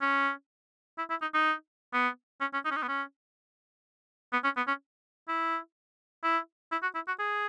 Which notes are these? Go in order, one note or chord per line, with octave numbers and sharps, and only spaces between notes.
C#4
E4
E4
D#4
D#4
B3
C#4
C#4
D#4
C#4
D#4
B3
C#4
B3
C#4
B3
C#4
E4
E4
E4
F#4
E4
F#4
G#4